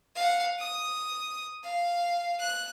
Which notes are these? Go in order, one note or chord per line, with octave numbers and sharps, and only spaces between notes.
F5 F#5
D#6
F5
F#6